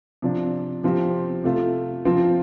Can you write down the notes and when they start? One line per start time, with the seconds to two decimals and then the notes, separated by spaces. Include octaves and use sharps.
0.22 C3 F3 D4
0.83 C3 F3 C4 G4
1.44 C3 A3 F4
2.05 C3 F3 C4 F4